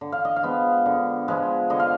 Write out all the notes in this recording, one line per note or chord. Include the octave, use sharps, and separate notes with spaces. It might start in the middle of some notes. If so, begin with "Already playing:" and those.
D3
F5
D#5
F5
F3 G#3 B3
D3
F3 G#3 B3
D3 D#5
F5